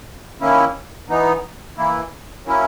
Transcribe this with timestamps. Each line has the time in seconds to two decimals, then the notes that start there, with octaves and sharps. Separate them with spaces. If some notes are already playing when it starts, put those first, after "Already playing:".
0.41 D#3 A#3 C#4 E4
1.09 E3 B3 D#4
1.77 E3 A#3 E4
2.45 F#3 A#3 C#4 E4